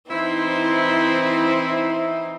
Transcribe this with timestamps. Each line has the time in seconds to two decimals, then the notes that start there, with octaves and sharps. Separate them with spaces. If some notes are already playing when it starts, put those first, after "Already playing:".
0.10 E3 C4 D#4 E4 C5